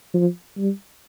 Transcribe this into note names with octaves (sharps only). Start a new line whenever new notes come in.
F3
G3